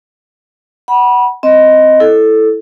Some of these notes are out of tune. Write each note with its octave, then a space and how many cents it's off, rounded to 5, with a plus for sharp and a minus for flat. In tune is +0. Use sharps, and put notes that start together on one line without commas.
F#5 +20 B5 -25
C4 +0 D#5 +0
E4 +0 A4 +0